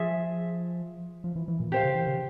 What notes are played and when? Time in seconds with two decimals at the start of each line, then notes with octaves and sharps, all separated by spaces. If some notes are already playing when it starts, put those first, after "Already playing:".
Already playing: F3 F4 G#4 E5
1.24 F3
1.36 E3
1.48 E3
1.60 A#2
1.72 G4 C5 F5
1.84 C#3
1.95 E3
2.07 C#3